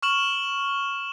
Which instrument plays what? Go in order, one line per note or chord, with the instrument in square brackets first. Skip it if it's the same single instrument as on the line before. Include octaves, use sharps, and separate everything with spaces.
[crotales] C#6 F6 E7 F#7